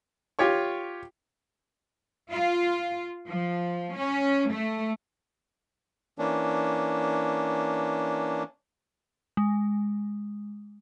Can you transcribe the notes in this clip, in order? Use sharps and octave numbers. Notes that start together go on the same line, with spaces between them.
F4 G4 C#5 C#6
F4
F3
C#4
A3
E3 A#3 C#4 D4
G#3